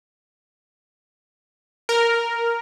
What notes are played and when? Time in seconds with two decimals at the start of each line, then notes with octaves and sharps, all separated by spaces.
1.89 A#4